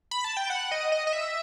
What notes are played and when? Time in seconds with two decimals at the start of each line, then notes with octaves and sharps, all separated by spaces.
0.11 B5
0.24 A5
0.37 G5
0.50 F#5
0.71 D#5
0.92 D#5
1.07 D#5
1.13 E5